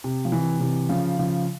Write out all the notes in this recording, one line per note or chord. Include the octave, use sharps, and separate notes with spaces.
C3
F3
C3 E3
C3 E3
C#3 F3
C#3 F3